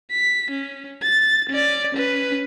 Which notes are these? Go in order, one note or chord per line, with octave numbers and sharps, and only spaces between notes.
B6
C#4
A6
C#4 D5
C#4 B4